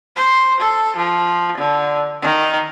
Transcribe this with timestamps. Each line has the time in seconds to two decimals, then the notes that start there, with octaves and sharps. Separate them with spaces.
0.16 C5
0.60 A4
0.96 F3
1.57 D3
2.22 D#3